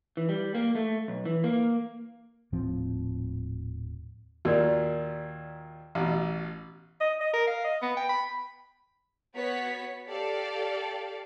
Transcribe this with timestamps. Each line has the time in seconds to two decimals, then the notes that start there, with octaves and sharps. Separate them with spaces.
0.17 E3
0.29 G3
0.55 A#3
0.75 A3
1.08 B1
1.25 E3
1.44 A#3
2.52 D#1 A2 F3 C4
4.45 D#2 A#2 F#4 A#4 D5
5.95 A1 B2
7.01 D#5
7.21 D#5
7.33 A#4
7.47 F5
7.64 D#5
7.82 B3
7.97 G5
8.09 B5
9.34 B3 F#4 C#5 B6
10.07 G4 A4 D5 F5